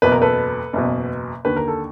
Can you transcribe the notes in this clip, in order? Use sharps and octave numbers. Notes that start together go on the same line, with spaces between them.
F#1 E2 B2 B4
A#4
A4 B4
F#1 E2 B2
D#2 D3 B4
A#4
A4